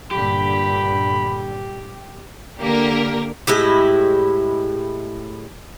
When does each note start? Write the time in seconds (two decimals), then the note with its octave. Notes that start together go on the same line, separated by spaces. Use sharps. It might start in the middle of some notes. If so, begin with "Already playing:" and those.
0.11 G2 A#2 D3 G4 B5
2.59 D3 A#3 G4 A#4
3.47 A2 G#3 E4 G4